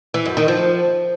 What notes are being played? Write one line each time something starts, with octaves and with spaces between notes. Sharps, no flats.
E3
F#2
D#3
F3